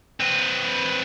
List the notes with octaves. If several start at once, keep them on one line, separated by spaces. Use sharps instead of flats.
C4 B4